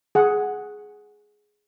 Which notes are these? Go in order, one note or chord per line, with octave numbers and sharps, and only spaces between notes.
G#4 F#5